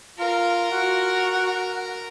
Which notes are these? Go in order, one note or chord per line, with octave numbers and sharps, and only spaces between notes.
F4 A#4
F#4